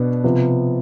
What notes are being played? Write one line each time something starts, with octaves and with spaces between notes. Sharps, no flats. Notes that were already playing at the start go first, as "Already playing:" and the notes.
Already playing: B2 B3 D4
C3 F3 B3